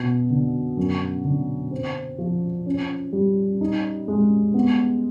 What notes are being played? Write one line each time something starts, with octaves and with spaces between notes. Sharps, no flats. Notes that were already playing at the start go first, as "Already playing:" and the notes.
Already playing: B2 B3
D3
F#2
D3
C4
F3
C#4
G3
D#4
G#3
B3